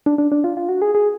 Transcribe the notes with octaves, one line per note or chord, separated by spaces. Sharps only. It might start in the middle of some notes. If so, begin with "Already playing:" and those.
D4
D4
D4
F4
F4
F#4
G#4
G#4